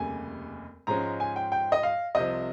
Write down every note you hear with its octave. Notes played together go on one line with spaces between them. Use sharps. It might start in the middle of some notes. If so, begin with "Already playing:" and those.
Already playing: F1 D#2 C#3 G3 G#5
G#2 F3 G#3 C#4 A#5
G#5
G5
G5
D#5
F5
C2 C3 F3 D#5